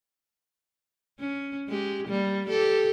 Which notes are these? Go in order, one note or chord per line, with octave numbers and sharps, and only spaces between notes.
C#4
G#3 G4
G3 A#3
G4 A4